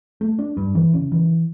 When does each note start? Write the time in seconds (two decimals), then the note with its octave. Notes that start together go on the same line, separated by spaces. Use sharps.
0.21 A3
0.39 D4
0.57 G2
0.75 E3
0.93 C#3
1.12 E3